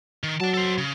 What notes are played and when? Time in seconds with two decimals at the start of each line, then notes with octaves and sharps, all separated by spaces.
0.23 D#3
0.40 F#3 D5 A5
0.54 A4 C5
0.78 C#3